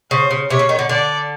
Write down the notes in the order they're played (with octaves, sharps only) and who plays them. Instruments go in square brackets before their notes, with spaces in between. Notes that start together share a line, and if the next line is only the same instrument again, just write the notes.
[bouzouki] C#3 [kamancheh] C5
[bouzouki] C#3
[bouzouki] C3 [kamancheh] C#5
[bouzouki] C#3
D#3
D3
[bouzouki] D3 [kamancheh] D5